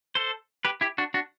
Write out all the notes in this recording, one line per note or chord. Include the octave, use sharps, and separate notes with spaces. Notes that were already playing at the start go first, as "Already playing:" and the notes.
A4 C5
G4 B4
E4 G4
D4 F#4
D4 F#4